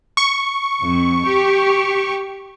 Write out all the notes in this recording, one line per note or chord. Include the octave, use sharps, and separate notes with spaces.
C#6
F2
G4